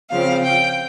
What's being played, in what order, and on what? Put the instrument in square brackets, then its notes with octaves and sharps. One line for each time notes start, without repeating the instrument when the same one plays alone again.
[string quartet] C#3 F3 C4 F5
G5